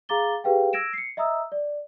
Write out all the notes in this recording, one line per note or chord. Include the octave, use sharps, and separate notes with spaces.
G#4 F5 A#5 D6 A6 G7
G4 G#4 B4 F5 G5
E6 G#6 A#6 D7 E7
C7 C#7
D#5 E5 A#5 D#6 E6
D5